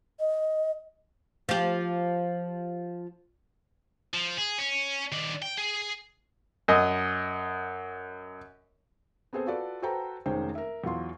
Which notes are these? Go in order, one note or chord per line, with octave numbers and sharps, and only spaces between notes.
D#5
F3 G4
F3
G#4
C#4
D#3 D4
G5
G#4
F#2 D#5
B3 C4 G#4 A4 C5
F4 F#4 A4 B4 D5
F#4 A4 B4 C5 G5 A#5
F1 D#3 G#3 C#4 C5 G5
A#4 E5
E2 F#3 F4 C6